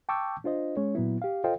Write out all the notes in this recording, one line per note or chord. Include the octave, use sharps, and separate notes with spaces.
G5 A5 C#6 D6 E6 G6
D4 F4 C5 D#5
G#3 C#4 C#5
A#2 F#3 B3 E4
G4 F5
F4 A4 C5 D#5 F5 G5